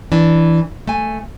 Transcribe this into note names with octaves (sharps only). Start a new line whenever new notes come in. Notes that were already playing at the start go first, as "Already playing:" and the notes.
E3 D4
A3 G#5